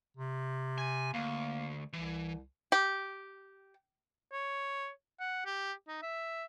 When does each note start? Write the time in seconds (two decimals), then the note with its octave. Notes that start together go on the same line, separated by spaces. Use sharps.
0.17 C3
0.78 G#5
1.14 D2 A#3
1.93 C2 E3
2.72 G4
4.32 C#5
5.20 F#5
5.45 G4
5.88 D#4
6.02 E5